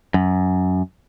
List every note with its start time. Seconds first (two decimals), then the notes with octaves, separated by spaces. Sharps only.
0.14 F#2